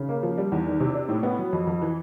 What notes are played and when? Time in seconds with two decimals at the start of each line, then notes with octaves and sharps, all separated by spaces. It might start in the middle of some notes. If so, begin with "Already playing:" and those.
Already playing: C#3
0.09 A#3
0.23 F3
0.37 G3
0.52 E2
0.66 D#3
0.80 C3
0.95 D4
1.09 A2
1.23 B3
1.38 F#3
1.53 F2
1.67 F2
1.82 E3